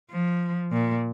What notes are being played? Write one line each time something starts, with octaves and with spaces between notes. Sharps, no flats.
F3
A#2